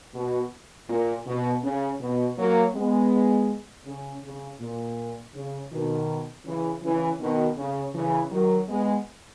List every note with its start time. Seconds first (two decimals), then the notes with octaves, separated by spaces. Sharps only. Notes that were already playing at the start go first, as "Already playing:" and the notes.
0.14 B2
0.88 A#2
1.26 B2
1.63 C#3
2.00 B2
2.37 F#3 A#3
2.74 G#3 B3
3.86 C#3
4.23 C#3
4.60 A#2
5.34 C#3
5.71 B2 D#3
6.45 C#3 E3
6.83 C#3 E3
7.20 B2 D#3
7.57 C#3
7.94 C#3 E3
8.32 D#3 F#3
8.68 G#3 B3